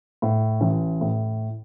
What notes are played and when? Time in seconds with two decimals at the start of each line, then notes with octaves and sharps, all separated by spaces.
0.22 A2
0.61 A1
1.01 A2